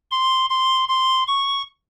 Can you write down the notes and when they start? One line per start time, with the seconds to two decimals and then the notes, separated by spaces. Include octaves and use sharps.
0.11 C6
0.50 C6
0.89 C6
1.27 C#6